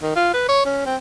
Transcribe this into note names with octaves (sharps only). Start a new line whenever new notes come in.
D#3
F4
B4
C#5
C#4
C4